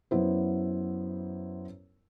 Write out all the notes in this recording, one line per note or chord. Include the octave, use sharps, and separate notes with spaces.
F#2 B3 E4 C5